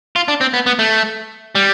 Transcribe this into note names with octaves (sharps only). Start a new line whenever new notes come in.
F4
D4
C4
B3
B3
A3
G3